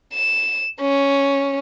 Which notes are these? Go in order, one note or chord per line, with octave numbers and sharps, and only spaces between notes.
E7
C#4